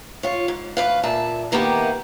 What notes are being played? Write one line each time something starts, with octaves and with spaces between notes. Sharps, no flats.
F4 C#5
G#2
D2 B4 F5
A#2 E5 A5
D#3 A#3 B3 E4 G4